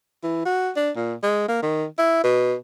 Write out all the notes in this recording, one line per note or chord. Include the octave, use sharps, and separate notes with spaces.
E3
F#4
D4
A#2
G#3
A#3
D#3
E4
B2